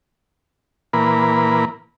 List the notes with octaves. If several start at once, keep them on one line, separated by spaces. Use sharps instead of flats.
A#2 E3 A#3 A#4 B4 B5